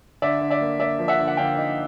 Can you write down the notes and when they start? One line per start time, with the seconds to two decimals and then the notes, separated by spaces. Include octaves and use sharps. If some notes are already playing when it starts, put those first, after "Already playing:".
0.22 D3 D5 E5
0.40 D3
0.50 D5 E5
0.61 A#3
0.79 A#3 D5 E5
0.99 F3
1.08 E5 F#5
1.18 D3
1.27 F#5
1.37 D3 F5 G5
1.57 D#4